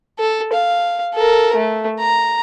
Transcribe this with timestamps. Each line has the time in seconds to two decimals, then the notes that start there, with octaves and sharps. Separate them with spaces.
0.19 A4
0.53 F5
1.14 A4 A#4
1.56 A3
2.00 A#5